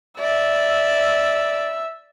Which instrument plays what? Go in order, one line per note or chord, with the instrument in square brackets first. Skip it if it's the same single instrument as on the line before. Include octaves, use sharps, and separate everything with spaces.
[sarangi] D5 [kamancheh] E5 E6